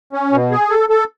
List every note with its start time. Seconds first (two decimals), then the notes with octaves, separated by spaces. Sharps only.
0.13 C#4
0.32 B2
0.51 G#4
0.70 A4
0.89 A4